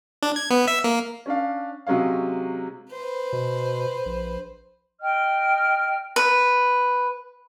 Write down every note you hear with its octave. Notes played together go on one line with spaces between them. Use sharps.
D4
G#6
B3
E5
A#3
C#4 D4 F5
C3 F#3 G#3 C#4 F5
B4 C5
B2
A#1
D#5 G5 F6
B4